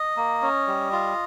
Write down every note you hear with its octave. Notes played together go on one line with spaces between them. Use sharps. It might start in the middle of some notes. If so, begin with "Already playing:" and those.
Already playing: D#5
A#3
C#4
G3
F4